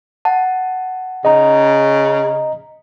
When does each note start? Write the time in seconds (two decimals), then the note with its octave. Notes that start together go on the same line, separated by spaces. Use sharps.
0.25 F#5 A5
1.25 C#3 D#5 A#5